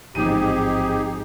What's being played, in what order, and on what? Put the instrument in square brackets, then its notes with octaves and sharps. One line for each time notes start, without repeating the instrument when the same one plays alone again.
[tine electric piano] A1 F3 C4 [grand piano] G#2 D#7 [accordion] D#4 G4 G#4